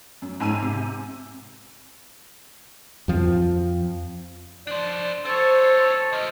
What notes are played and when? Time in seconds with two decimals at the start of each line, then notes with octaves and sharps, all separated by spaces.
0.22 F#2
0.40 G#2 G#5 E6 D#7
0.62 C3
3.08 F2 F3 C4
4.67 F3 D4 C5 D5
5.25 C4 A4 C5 C#5
6.13 F3 C#4 D#5